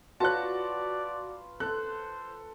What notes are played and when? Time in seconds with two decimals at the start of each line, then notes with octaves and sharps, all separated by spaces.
0.20 F4 F#4 B4 C#5 D5 A5 C#6 F#6
1.60 A4 C5 F#6